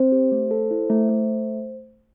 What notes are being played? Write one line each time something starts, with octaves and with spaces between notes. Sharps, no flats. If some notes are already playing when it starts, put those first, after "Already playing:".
Already playing: C4 C5
G4
A3
A4
E4
A3
A3